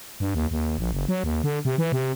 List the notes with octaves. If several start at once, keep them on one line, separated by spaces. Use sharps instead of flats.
G2
D#2
D#2
A#1
F#1
F#3
D#2
D3
C3
E3
C3